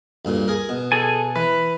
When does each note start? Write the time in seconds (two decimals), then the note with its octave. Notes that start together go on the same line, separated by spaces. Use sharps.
0.25 D2 G2 A#2
0.48 G#4 A#4
0.69 B2
0.92 G#4 A4 G#5
1.36 E3 B4